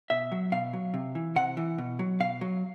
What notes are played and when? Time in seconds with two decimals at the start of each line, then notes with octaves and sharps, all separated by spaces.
0.10 B2 E5
0.32 F#3
0.52 B2 F5
0.73 F#3
0.94 C3
1.15 E3
1.36 C3 F#5
1.57 E3
1.78 B2
1.99 F#3
2.20 B2 F5
2.41 F#3